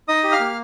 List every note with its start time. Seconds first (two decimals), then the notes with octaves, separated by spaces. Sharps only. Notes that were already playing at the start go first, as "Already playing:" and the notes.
0.08 D#4 D#5 D#6
0.24 G4
0.32 F5 F6
0.40 A#3